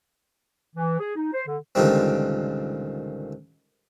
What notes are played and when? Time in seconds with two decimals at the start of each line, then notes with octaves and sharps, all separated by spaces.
0.76 E3
1.00 G#4
1.16 D#4
1.33 C5
1.47 D3
1.75 C#2 A#2 D3 D#3 G3 C4